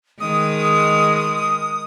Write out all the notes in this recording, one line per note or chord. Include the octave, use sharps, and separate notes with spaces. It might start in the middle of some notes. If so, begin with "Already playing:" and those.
D#3 G#3 D#6